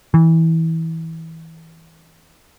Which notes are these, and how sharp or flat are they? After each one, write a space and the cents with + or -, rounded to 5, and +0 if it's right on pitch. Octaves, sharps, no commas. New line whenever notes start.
E3 -20